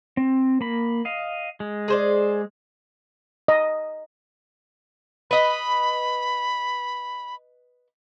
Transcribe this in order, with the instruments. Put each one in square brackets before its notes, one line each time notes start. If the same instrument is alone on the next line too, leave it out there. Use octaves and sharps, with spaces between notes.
[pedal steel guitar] C4
A#3 B5
D#5 F5
G#3
[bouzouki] G#4 C5 D5
[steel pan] D#5
[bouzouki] B4 D#5 [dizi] B5